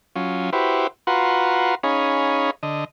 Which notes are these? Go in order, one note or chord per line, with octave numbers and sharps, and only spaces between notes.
F#3 C#4 F4
E4 F#4 G4 B4 C5
F4 F#4 B4 F#5 A#5 C6
C#4 D#4 G#4 C#5 F5 B5
D3 D#5